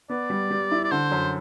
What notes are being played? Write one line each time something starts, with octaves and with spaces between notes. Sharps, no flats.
B3 D5
G3
G3
E4
D5
D3 C5
F#2